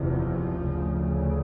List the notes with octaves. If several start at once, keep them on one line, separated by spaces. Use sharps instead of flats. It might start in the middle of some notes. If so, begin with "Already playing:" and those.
Already playing: F#1 E2 C3 F3
D2 C#3